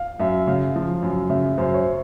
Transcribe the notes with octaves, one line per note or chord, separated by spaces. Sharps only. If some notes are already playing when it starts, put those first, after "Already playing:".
Already playing: F5
F#2 E5
C#3 F5
F3
F#2
C#3 E5
F#2 C5
C#5
C5